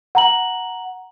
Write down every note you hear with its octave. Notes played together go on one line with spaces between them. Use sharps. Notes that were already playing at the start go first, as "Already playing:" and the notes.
F#5 A#5 F#7